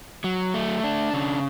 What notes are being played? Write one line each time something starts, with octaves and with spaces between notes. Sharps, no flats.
F#3
A3
D4
C#3